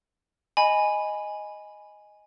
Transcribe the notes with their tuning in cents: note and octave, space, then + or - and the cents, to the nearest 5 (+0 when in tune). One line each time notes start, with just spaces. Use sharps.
D#5 +0 G#5 +0 B5 +0